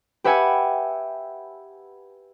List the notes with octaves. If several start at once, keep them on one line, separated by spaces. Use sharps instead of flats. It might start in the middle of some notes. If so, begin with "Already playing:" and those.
G4 B4 E5 F#5 G#5